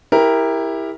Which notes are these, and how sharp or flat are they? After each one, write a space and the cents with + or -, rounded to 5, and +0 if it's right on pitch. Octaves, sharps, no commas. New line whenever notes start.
E4 -5 G4 +25 A#4 +0